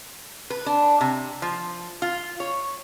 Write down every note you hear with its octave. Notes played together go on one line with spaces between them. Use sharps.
B4
D4
C3
F3
F4
C#5